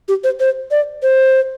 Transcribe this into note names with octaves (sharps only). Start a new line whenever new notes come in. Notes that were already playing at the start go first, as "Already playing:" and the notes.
G4
C5
C5
D5
C5